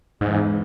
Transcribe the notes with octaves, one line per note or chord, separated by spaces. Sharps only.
E2 G#2 E3 G#3